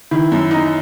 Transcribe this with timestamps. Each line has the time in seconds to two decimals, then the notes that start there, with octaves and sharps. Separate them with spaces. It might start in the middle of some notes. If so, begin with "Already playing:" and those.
0.11 D#3 E4
0.32 F#2
0.51 D#4